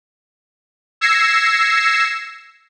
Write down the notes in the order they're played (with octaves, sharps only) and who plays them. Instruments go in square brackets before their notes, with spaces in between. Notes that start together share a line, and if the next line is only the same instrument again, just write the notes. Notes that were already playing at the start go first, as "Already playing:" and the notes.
[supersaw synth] E6 G#6 A#6 C7 C#7 E7